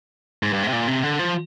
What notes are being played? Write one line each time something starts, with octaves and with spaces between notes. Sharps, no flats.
G#2
G2
G#2
C3
A#2
C3
D3
F3